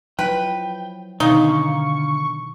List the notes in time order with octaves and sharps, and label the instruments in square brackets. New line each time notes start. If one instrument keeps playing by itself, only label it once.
[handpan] F3 F#3 E4 [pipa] B4 [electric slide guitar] G5
[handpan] B2 D#3 B3 [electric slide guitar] D3 F5 [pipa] D#4 [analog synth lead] C#6